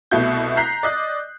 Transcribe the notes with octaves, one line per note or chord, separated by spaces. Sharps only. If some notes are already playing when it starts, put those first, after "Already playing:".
C2 B2 A3 E4 F#4 G6
A#5 F#6 G6 B6 C7
D5 D#5 F#6